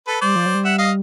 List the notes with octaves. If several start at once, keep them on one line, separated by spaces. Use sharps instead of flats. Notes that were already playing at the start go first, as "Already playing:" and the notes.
A4 B4
G3 C5 D5
F3
F#3
G3
E5 F#5
D#5 F5